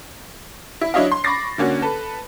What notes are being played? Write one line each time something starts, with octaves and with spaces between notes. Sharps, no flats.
E4
F#3 D4 E4 C#5 D#5 F5
C6
B5 C#6 D6 A6 A#6 C7
D3 A#3 C#4 F#4
A4 B4